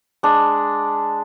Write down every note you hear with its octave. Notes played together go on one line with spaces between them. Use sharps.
G#3 D4